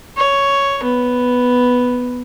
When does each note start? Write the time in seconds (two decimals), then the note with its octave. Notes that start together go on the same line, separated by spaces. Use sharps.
0.17 C#5
0.83 B3